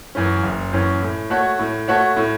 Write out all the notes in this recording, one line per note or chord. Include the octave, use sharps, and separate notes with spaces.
F#2 E3 C#4
F#1
F#2 E3 C#4
A2
A3 F#4 C#5
A2
A3 F#4 C#5
A2